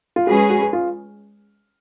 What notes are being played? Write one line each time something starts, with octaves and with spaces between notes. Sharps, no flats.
F4
G#3 C#4 F#4 G#4 B4
F#4
G#4
F4